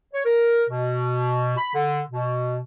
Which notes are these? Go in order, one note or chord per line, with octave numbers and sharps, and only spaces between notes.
C#5
A#4
B2
B5
D3
B2